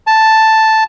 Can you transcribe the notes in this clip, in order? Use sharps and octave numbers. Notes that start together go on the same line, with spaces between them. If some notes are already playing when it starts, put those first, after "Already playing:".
A5